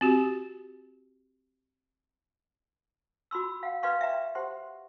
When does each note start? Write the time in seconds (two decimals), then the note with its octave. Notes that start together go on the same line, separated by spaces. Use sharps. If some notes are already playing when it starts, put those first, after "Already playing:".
0.01 C4 F#4 G4
3.31 F#4 B5 C6 E6
3.63 F5 F#5
3.83 B4 D5 D#5 F5 C6 C#6
4.01 E5 G5 A#5
4.35 G4 C5 F#5 C6